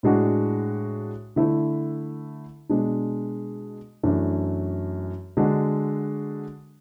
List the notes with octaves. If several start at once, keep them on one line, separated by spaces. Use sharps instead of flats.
A2 G#3 D4 F#4
D3 A3 E4
B2 G#3 D4
F#2 E3 A3 D4
D3 G#3 D4 F#4